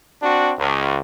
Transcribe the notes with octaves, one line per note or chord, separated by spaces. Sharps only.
C4 D4 F#4
C#2